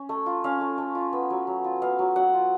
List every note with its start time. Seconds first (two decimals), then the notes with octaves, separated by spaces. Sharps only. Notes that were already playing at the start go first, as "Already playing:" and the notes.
Already playing: C#4
0.09 A3
0.26 F4
0.44 C#4 F5
0.61 A3
0.78 A3
0.95 F4
1.13 B3
1.30 F#3
1.47 F#3
1.64 F4
1.82 B3 F5
1.99 F#3
2.16 F#3 F#5
2.33 F4